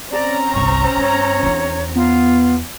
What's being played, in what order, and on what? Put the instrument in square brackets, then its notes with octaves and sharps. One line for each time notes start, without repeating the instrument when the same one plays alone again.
[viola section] C4 C#4 A#5 [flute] D5
[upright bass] G1 C2 [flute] C#6
[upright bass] G2 [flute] C#5
[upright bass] E2 D4
[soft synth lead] B3 [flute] F4